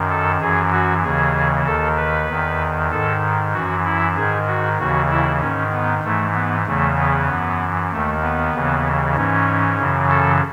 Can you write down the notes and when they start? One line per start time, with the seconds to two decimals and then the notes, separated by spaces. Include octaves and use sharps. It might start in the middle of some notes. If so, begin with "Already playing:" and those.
Already playing: F#2 D#3
0.10 A4
0.41 F#2 E3 G#4
0.72 F#4
1.03 D#2 C#3 E3 G#4
1.66 D#2 D#3 A4
1.97 B4
2.29 E2 D#3
2.91 G#2 D#3 A4
3.53 F#2 E3 F#4
3.85 E4
4.16 G#2 D#3 G#4
4.47 F#4
4.79 D#2 C#3 E3 F#4
5.10 E4
5.41 G#2 D#3 C#4
5.72 B3
6.04 G#2 E3 A3
6.35 B3
6.66 E2 C#3 E3 A3
6.98 B3
7.29 F#2 E3
7.92 D#2 D#3 A3
8.23 B3
8.54 D#2 C#3 E3
9.16 G#2 E3 C#4
9.79 F#2 C#3 E3
10.11 A4